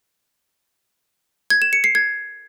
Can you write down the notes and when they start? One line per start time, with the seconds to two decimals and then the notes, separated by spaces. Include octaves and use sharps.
1.50 G#6
1.62 E7
1.73 C#7
1.84 C7
1.95 G#6